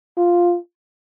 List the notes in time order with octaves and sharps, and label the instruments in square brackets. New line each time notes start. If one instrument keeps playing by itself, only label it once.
[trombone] F4